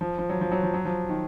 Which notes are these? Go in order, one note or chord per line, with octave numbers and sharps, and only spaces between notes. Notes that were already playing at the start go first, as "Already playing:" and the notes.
F3
F3
F#3
F3
F#3
F3
F#3
F3
D#3